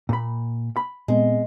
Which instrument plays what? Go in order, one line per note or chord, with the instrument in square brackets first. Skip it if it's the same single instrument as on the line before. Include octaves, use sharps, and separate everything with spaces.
[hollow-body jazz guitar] A#2 B5
B5
[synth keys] A#2 B3 C4 [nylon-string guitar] G#3